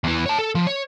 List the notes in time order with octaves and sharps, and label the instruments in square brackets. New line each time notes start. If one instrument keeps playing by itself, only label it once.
[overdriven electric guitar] E2 E3
C#5 A5
A4
F3
C#5